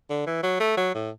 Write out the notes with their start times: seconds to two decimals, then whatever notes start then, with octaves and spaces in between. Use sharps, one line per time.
0.10 D3
0.27 E3
0.43 F#3
0.60 A3
0.77 F#3
0.94 A2